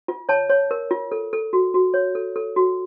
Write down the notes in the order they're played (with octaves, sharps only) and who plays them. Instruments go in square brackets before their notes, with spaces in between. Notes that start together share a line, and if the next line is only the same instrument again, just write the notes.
[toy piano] F4
C#5 A5
C#5
A#4
F4
A4
A4
F#4
F#4
C#5
A4
A4
F#4